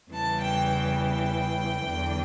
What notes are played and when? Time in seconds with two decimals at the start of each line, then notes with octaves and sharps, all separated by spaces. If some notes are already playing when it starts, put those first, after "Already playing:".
0.12 E2 C#3 E3 G3 A5
0.42 G5
0.71 G5
1.87 E2 D3 F#3